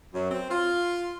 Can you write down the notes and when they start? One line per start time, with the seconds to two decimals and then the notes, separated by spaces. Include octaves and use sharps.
0.13 F#2
0.30 C4
0.51 F4